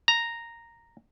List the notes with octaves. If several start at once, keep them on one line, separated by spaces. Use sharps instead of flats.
A#5